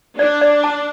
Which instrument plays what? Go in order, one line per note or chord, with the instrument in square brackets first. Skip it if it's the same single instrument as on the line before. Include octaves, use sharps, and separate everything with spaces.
[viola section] D4 [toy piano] D5
[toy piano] D5
A5